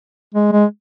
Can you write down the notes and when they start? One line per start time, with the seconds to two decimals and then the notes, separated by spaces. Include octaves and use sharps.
0.35 G#3
0.52 G#3